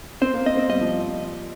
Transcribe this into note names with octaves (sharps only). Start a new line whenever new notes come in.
C4 C5
A#3
C4 D#5
C4
G3 D#5
F3